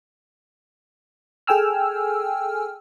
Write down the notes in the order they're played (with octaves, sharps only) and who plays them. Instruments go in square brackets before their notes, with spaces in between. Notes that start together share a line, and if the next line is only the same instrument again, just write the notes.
[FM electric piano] G#4 A4 G5 G#5 E6 F6